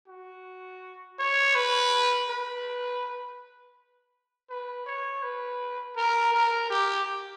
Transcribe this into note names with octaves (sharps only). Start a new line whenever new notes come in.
F#4
C#5
B4
B4
B4
C#5
B4
A#4
A#4
G4